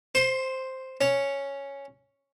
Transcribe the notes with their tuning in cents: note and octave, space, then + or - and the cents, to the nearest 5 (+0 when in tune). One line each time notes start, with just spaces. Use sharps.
C5 +0 C6 +25
C#4 +0 C#5 +0